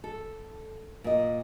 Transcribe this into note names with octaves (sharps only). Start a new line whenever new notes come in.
A4
A#2 D#5